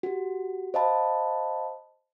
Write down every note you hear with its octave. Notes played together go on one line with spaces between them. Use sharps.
F#4 G4
C5 D#5 F5 A5 B5